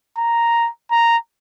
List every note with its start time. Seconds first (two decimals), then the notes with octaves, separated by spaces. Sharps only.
0.17 A#5
0.91 A#5